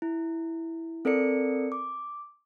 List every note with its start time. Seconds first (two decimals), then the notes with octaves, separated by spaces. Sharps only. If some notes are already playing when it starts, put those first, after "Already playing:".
0.02 E4
1.05 C4 A4 A#4 D5 C#7
1.72 D6